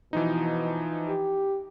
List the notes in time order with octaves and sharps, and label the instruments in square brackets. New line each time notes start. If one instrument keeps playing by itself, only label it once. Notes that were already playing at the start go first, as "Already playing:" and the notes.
[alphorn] B2 [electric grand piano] E3 F3 D#4
[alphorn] G4